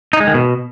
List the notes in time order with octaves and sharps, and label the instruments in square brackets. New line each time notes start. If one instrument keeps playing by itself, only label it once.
[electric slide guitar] D#4
G#3
D#3
B2